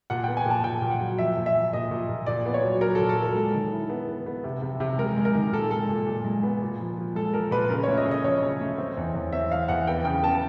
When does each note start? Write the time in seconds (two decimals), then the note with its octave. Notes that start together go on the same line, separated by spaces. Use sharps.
0.10 A#2 F#5
0.24 B3 G5
0.37 G#5
0.46 A#2 A5
0.64 A#2 G5
0.82 A#2
0.91 F#5
1.01 F#3
1.18 F3 E5
1.37 A#2
1.46 E5
1.55 F3
1.73 A#2 D#5
1.91 A#2
2.09 A#2
2.26 A#2 D5
2.46 B3
2.54 C#5
2.63 F#3
2.81 F#3 A#4
2.95 A#2 A4
3.09 A4
3.18 F#3 A#4
3.36 G#3 A4
3.54 D#3
3.72 E4
3.90 B3
4.08 B3
4.26 B3
4.44 C3
4.62 C3
4.80 C3
4.98 G#3 A#4
5.17 G#3
5.25 A#4
5.35 D#3
5.52 A#2 A4
5.71 G#3 A4
5.89 A#2
6.06 A#2
6.25 G#3
6.43 B3
6.62 A#2
6.80 F3
6.98 F3
7.15 G#3 A4
7.33 F3 A#4
7.51 A#2 B4
7.70 C#3 A#4
7.83 A3 C#5
7.97 D#5
8.06 C#3
8.11 D#5
8.24 F3 C#5
8.43 C#3
8.60 A3
8.78 C4
8.97 E2
9.15 E2
9.32 C4 E5
9.51 E2 F5
9.68 E2 F#5
9.87 B3 G5
10.05 C#3 G5
10.23 B3 A5